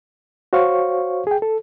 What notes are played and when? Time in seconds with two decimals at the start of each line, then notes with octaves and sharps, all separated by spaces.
0.53 F#4 C5 C#5 F5 C#6
1.27 G#4 G5
1.42 A4